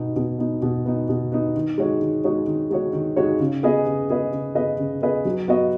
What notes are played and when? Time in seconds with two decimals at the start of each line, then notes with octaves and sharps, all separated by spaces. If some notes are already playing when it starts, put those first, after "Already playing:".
Already playing: B2 B3 D#4
0.16 B2
0.39 B3 D#4
0.62 B2
0.86 B3 D#4
1.09 B2
1.32 B3 D#4
1.55 D#3
1.78 G#3 D#4 F#4 C#5
2.01 D#3
2.24 G#3 D#4 F#4 C#5
2.47 D#3
2.70 G#3 D#4 F#4 C#5
2.93 D#3
3.16 G#3 D#4 F#4 C#5
3.40 C#3
3.63 B3 G#4 B4 D#5
3.86 C#3
4.10 B3 G#4 B4 D#5
4.32 C#3
4.55 B3 G#4 B4 D#5
4.79 C#3
5.01 B3 G#4 B4 D#5
5.25 F#3
5.48 B3 F#4 D#5